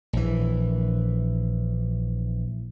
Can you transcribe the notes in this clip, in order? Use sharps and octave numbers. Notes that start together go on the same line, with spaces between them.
A#1 E3